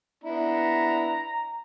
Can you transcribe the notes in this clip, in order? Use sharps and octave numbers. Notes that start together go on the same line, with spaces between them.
B3 D4 E4 A#5